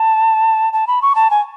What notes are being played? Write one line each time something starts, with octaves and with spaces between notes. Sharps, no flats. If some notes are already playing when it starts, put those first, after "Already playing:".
Already playing: A5
A5
B5
C#6
A5
G#5